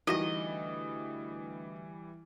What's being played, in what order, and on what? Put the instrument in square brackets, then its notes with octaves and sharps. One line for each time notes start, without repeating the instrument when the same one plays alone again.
[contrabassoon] D2 [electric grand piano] E3 G3 [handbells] D#4 F#4 A#6 [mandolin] D#5